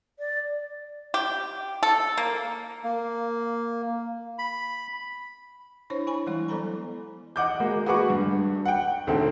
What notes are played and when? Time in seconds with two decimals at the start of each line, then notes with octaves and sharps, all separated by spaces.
0.19 D5
1.14 G4
1.83 A4
2.17 A#3
2.84 A#3
4.38 B5
5.90 D4 E4 C5 C#5
6.07 E4 G#5 B5
6.27 E3 G3 G#3 E4 C6
6.48 F#3 B3 A4 C5 A#5 B5
7.36 D#5 F#5 D6 G6
7.60 G#3 A#3 F#4
7.86 F#4 G#4 B4 F#5 C#6 D6
8.10 G2
8.65 F#5 G5
9.07 E1 D2 D#3 A3 C4